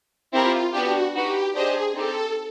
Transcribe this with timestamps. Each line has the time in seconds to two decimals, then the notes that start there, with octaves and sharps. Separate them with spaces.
0.33 C4 E4 F4 G4 A#4
0.73 B3 D4 F#4 G4
1.14 D#4 F#4 G4 B4
1.53 D4 G4 G#4 C5 D#5
1.94 C4 D#4 G4 A4